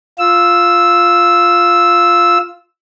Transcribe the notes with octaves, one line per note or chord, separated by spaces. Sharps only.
F4 E6